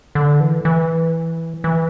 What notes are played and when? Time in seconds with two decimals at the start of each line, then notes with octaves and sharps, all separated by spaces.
0.15 D3
0.40 E3
0.65 E3
1.64 E3